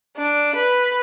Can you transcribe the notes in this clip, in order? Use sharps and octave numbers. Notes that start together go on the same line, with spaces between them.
D4
B4